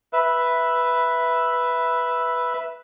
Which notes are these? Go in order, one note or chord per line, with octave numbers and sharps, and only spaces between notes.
B4 E5